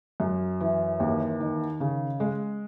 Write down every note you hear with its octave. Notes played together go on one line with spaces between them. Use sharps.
F#2
E3
D#2
D#3
C#3
G#3